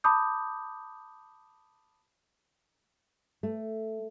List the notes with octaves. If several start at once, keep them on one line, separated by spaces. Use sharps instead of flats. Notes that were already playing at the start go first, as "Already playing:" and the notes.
A5 B5 D6 D#6 G6
A3